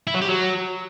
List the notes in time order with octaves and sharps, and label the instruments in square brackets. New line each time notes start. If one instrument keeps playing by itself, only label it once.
[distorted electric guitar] E4
F#3
G4
F#3